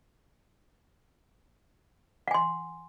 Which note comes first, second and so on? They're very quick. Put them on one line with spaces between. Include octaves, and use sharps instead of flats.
F#5 G#5 C6